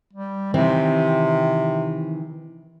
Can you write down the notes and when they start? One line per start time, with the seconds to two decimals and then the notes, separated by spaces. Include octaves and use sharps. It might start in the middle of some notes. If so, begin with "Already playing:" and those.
0.13 G3
0.54 C3 D#3 E3 C4